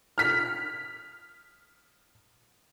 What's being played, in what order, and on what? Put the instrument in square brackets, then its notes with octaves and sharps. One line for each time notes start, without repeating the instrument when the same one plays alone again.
[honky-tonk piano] F6 B6